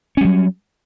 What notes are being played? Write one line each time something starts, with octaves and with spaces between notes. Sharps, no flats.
F#3 G3 C#4